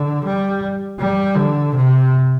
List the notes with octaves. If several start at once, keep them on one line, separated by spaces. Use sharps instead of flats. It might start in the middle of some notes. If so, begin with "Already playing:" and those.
Already playing: D3
G3
G3
D3
C3